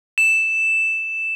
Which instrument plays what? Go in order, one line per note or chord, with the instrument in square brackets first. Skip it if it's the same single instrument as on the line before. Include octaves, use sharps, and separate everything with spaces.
[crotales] E7